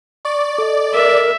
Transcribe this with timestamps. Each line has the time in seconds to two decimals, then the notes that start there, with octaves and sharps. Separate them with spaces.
0.25 D5 C#6
0.58 A4 D#5
0.94 A#4 E5